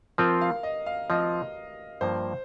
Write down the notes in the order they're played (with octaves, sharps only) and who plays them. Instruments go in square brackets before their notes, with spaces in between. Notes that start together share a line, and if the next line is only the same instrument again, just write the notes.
[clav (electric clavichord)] F3 C4 F4 [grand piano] A#4
[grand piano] F5
D#5
F5
[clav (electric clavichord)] F3 C4 F4 [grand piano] D#5
[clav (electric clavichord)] G2 F3 A#3 [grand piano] C5